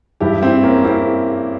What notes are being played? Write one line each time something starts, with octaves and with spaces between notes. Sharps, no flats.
G2 E3 E4 G4
C4 E4
A#3 C#4
C4 E4